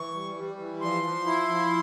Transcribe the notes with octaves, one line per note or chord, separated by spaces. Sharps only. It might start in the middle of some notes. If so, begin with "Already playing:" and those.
Already playing: E3 C#6
G3
G3
E3
F3 C6
F3
E4
F3